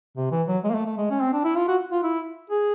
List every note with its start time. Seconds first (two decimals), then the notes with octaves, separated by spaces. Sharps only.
0.17 C3
0.31 E3
0.47 F#3
0.64 G#3
0.70 A#3
0.75 A3
0.86 A3
0.98 G#3
1.10 C#4
1.21 C4
1.33 D4
1.44 E4
1.56 F4
1.68 F#4
1.92 F4
2.03 E4
2.50 G#4